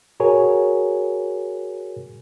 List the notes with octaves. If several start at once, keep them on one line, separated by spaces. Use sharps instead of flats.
F#4 G#4 A#4 C#5 G#5